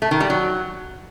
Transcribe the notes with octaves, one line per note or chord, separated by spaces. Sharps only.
A3
D#3
G3
F#3